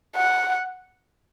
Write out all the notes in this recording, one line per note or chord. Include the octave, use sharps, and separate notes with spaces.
F#5